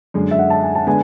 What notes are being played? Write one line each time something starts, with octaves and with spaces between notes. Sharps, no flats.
F#2 D3 G#3
E5
F#5
A5
G#5
A5
D3 G#3 B3 G#5